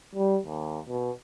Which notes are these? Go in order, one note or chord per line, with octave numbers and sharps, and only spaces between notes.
G3
D#2
B2